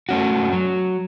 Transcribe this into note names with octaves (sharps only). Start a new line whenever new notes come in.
A3 C#4 F#4
F#3